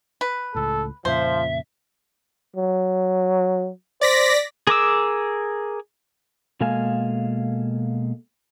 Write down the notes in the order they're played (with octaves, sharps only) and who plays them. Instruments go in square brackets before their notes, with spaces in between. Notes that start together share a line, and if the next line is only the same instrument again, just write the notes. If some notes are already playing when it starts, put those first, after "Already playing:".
[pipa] B4
[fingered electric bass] C#2 A2 [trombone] A4
[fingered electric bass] F2 A#2 C#3 [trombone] F3 [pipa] C5 [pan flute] E5
[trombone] F#3
[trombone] C5 [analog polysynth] D5 A#6 B6
[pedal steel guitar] G#4 A#4 D6 E6
[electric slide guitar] B2 G#3 A#3 A4 F5 G#5